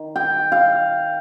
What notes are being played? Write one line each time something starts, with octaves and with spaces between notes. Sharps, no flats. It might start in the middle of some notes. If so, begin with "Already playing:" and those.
Already playing: D#3
G5
F5